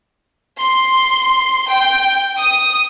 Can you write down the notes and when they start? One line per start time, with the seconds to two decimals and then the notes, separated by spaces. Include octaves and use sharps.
0.58 C6
1.68 G5
2.37 D#6